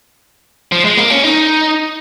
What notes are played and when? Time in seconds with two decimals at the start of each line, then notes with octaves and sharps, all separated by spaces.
0.72 F3
0.85 G#3
0.97 A#3
1.10 C#4
1.24 D#4